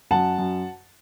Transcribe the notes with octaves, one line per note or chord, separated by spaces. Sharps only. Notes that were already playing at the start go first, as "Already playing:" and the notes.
F#2 F#5 A5
F#2